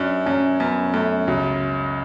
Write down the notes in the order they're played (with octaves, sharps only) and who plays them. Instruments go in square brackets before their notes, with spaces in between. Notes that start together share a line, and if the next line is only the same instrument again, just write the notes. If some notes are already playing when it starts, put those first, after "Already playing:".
Already playing: [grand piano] F#2 [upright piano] D4
[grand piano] F#2 [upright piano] C#4
[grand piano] F#2 [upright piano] B3
[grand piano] F#2 [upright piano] A3
[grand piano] C#2 [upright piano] F#3